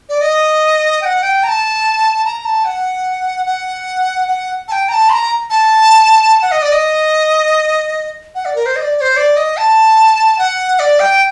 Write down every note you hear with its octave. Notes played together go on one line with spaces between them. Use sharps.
D5
D#5
G5
F#5
G5
A#5
A5
A#5
A5
F#5
F#5
F#5
A5
G5
A#5
A5
C6
A#5
A5
F#5
D#5
D5
D#5
F#5
D5
A#4
C5
D#5
D5
D5
C5
D5
D#5
A5
F#5
D5
G5